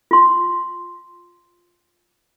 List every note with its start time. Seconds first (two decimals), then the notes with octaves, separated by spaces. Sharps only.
0.11 F4 C6